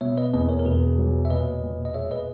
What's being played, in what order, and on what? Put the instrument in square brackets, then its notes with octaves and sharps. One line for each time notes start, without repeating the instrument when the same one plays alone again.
[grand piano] B2 [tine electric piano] C#5 E5
[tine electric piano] B4 D#5
[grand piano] E2 [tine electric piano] B4 D#5
[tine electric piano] A#4 C#5
A#4
[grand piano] E1 [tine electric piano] G#4 B4
[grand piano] F#3
[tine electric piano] E5
[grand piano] A#2 [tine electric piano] B4 D#5
[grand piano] A#2
[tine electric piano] D#5
[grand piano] G#3 [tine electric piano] C#5 E5
[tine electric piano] B4 D#5